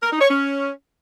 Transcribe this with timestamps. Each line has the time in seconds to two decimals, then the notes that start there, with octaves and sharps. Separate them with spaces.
0.03 A#4
0.12 D#4
0.21 C#5
0.30 C#4